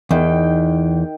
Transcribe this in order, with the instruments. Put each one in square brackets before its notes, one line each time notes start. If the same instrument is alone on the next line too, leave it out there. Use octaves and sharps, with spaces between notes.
[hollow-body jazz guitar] E2 [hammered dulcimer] D#3 G5